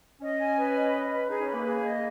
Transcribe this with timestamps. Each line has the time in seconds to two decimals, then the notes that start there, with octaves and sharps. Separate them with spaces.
0.21 C#4 D#5
0.39 G#5
0.56 B4
0.75 D#5
0.93 D#5
1.10 B4
1.28 D#4 G#4
1.41 C#4
1.47 B4
1.53 A#3
1.64 G#4
1.83 D#5